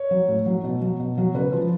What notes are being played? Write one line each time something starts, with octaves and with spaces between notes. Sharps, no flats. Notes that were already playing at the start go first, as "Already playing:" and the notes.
Already playing: C#5
F#3
A2
F#3
B2
F#3
B2
F#3
C#3 B4
F3